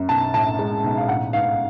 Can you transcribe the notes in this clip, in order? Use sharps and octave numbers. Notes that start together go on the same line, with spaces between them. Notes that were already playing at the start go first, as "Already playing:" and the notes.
Already playing: F#2
B1 A5
A2 A5
G#3
B1
F5
A1 F#5
G#2 F5